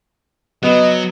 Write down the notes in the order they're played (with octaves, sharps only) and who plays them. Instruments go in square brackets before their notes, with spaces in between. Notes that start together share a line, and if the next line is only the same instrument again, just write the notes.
[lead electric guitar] F#3 [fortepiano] B3 [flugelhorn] D#5